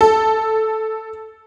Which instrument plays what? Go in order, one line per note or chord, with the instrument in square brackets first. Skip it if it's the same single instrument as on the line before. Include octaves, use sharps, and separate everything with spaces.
[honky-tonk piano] A4